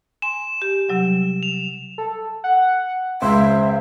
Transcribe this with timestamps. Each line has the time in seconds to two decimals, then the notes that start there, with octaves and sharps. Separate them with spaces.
0.22 G#5 C6 E7
0.62 G4
0.89 C3 F#3 G3
1.43 F7
1.98 A4
2.44 F#5
3.22 C#2 C5 E5